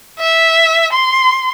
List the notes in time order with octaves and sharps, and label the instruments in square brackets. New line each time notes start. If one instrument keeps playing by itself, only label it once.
[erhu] E5
C6